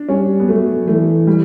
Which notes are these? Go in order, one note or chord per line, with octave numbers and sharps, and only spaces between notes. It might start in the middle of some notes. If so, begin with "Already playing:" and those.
Already playing: D4
G3 C#4
B3
F#3 A3
E3 A3
G3